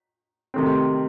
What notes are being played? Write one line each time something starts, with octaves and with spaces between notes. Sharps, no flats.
C3 D#3 A3 C4